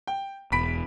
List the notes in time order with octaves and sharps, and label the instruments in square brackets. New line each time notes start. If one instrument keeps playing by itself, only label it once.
[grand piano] G5
[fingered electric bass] E1 [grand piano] B5 B6 D7